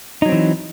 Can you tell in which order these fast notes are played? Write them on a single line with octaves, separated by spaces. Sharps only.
D#4 F#3 C4 E3